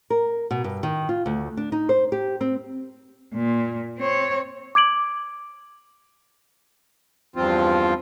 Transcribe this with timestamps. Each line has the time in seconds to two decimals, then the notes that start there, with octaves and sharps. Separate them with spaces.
0.10 A#4
0.51 B2
0.64 G2
0.83 D#3
1.09 F4
1.26 D2
1.57 D4
1.72 D#4
1.89 C5
2.12 G4
2.41 C4
3.34 A#2
3.98 C4 C#5
4.75 D6 G#6 D7 F#7
7.36 E2 G2 F3 C4 F4